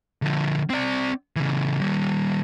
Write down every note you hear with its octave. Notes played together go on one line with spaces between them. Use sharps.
D3 F3
C4 D5
C#3 E3
D#3 G3